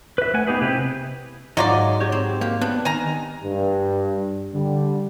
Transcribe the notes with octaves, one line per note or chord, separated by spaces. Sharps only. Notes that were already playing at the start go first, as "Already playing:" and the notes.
B4 E5
A3 B4 F#5 G#5
B3 D#4 G4 G#4 B4
C3 E4 G4 B4
G#2 F#3 F4 F#4 D5 D#5
G4 C#5
C4
A#3 G4
B3 D4
D#3 G#5 A#5
G2
D3 G3